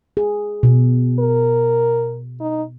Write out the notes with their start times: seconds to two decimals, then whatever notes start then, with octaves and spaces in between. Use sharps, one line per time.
0.17 G#4
0.63 B2
1.19 A#4
2.40 D#4